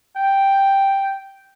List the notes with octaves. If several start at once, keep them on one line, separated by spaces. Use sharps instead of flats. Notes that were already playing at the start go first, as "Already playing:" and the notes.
G5